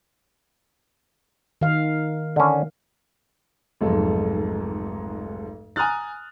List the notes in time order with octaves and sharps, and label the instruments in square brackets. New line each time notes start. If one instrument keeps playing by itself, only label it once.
[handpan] D#3 F5
[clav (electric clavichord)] D3 C#4
[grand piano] F1 B1 G#2 A4
G#5 A#5 D#6 F6 F#6 A6